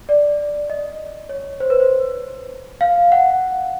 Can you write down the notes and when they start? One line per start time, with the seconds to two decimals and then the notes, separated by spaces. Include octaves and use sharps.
0.09 D5
0.70 D#5
1.29 C#5
1.60 C5
1.70 B4
1.80 C5
2.81 F5
3.12 F#5